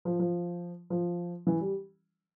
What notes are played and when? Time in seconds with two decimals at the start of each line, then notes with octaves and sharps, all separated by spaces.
0.05 F3
0.19 F3
0.90 F3
1.47 E3
1.61 G3